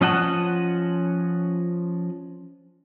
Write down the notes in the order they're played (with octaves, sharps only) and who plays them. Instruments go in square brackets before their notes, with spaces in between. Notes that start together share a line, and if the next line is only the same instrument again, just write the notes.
[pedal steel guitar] F3 C#4 D#5 F#5 A5